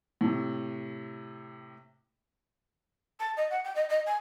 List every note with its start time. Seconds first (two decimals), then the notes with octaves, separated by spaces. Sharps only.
0.21 A2 C3
3.20 A5
3.37 D#5
3.51 F#5
3.64 G5
3.76 D#5
3.89 D#5
4.06 G#5